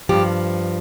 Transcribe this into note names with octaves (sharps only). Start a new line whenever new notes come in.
G2 F3 G4